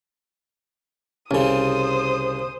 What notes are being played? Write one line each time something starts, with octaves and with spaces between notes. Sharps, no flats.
C2 C#3 C#4 C5 D#6